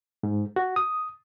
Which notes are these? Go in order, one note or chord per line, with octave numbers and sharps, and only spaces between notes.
G#2
F#4
D#6